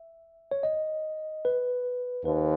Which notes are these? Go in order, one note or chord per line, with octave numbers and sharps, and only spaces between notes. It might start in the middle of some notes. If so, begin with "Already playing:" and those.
Already playing: E5
C#5
D#5
B4
D#2 B4